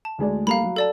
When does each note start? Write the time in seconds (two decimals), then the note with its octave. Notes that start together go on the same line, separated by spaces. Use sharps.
0.05 A5
0.18 D2 G#3 D5
0.47 G3 A3 A#3 F5 A#5 B5
0.63 F#3
0.76 A4 D5 A5